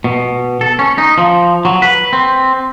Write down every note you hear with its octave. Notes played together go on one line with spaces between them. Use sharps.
B2
A4
C#4
D#4
F3
F#3
B4
C4